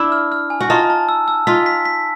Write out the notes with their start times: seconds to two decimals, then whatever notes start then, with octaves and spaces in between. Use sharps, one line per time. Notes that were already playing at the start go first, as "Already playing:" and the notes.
Already playing: D4 E4
0.12 F6
0.32 F6
0.50 G#5
0.61 F#4
0.70 D#4 F4 A5
0.90 A5
1.09 E6
1.28 E6
1.47 D#4 F4 B6
1.66 B6
1.85 B6